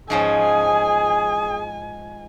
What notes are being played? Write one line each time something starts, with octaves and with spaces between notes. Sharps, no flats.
G#2 F3 C#4 G#4 G#5